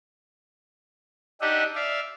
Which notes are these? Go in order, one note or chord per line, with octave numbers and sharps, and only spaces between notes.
D4 D#4 G4 D#5 E5 F#5
D5 E5 F5